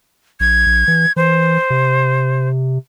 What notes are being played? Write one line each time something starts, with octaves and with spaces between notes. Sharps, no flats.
A#1 G#6
A#1
E3
E3 C5
C3